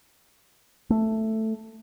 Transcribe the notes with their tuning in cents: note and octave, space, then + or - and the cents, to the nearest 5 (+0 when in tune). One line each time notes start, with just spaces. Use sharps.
A3 +5